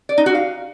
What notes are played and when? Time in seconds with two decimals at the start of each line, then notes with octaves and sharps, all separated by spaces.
0.09 D5
0.18 D#4
0.26 F#4
0.35 F5